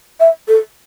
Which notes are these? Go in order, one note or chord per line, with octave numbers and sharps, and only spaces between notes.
E5
A4